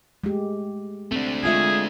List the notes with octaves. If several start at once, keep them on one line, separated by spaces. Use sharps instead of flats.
G#3 A3 G4
A3 C4 D4
G#3 F4 G#4 E5